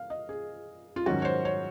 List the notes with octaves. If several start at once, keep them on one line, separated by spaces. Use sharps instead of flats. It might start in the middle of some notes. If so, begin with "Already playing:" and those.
Already playing: F5
D#5
G#4
F4
G#2 D#3 F#3 C#4 F#4
C#5
C5
C#5